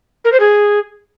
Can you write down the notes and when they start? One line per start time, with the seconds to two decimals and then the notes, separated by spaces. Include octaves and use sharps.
0.25 A#4
0.32 C5
0.40 G#4